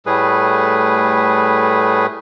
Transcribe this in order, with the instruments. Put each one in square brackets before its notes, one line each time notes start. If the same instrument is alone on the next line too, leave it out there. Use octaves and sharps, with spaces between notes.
[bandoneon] A2 G3 A3 G#4 B4